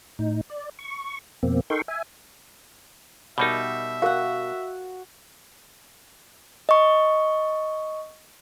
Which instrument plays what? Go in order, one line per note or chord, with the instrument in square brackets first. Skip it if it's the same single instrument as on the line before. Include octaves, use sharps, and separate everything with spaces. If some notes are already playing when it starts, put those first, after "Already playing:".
[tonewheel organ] A2 D#4
D5
C#6
F2 B2 A#3 C4
D#4 A4 A#4 G5 C6 C#6
E5 G#5
[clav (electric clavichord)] B2 G3 D#4 [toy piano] A#4 D5 B5 [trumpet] E5
[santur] F#4 F#5 [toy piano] A#4 F5
[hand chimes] D#5 C#6